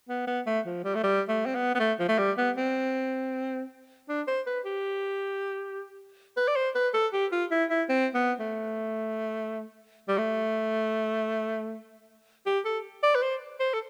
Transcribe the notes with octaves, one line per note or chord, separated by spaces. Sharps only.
B3
B3
A3
F3
G3
A3
G3
A3
C4
B3
B3
A3
F3
A3
G3
B3
C4
D4
C5
B4
G4
B4
D5
C5
B4
A4
G4
F4
E4
E4
C4
B3
A3
G3
A3
G4
A4
D5
B4
C5
C5
A4